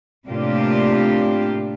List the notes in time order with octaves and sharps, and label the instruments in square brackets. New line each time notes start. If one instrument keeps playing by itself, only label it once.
[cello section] A2 C3 A#3 D4 F4 G4